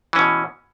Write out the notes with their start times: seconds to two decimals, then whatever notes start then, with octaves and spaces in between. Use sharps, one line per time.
0.13 E3
0.16 C#4
0.19 B2